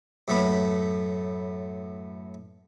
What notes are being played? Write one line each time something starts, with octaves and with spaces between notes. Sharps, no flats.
F#2 A2 A3 B3 B5